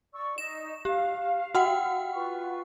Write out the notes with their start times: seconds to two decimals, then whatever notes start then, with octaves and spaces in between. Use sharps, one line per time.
0.14 D5 C#6 E6
0.38 D#4 D#5 E7
0.85 G4 F5
1.55 F#4 F#5 G5
2.13 F4 B4 C#6